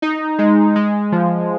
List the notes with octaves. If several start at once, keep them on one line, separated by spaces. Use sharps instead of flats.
D#4
G#3
G#3
F3